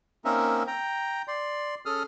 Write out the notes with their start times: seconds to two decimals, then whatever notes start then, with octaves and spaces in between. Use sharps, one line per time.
0.25 A#3 C4 C#4 D#4 A#4 E5
0.67 G5 A#5
1.28 D5 C6
1.86 C#4 G#4 A4 D#6 F6